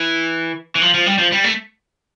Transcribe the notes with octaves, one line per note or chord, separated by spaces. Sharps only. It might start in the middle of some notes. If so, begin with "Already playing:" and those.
Already playing: E3
E3
F3
F3
G3
F3
G3
A3